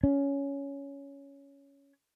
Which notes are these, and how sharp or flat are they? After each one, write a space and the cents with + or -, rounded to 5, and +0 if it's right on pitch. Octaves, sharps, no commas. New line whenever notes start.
C#4 +10